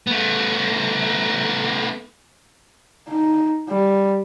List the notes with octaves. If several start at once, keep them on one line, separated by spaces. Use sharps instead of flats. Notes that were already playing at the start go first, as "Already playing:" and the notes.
A3 B3
D#4
G3